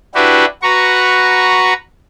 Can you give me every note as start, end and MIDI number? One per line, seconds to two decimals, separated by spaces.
0.15 0.45 62
0.15 0.45 64
0.15 0.45 66
0.15 0.45 67
0.15 0.45 71
0.63 1.73 66
0.63 1.73 71
0.63 1.73 82
0.63 1.73 85